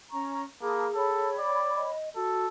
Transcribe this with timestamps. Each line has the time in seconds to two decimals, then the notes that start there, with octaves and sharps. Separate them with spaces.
0.11 C#4 A#5 C#6
0.62 A#3 G#4 A5 B5 D#6
0.95 A4 C#5 G5 B5
1.39 D5
1.76 D#5
2.16 F#4 A4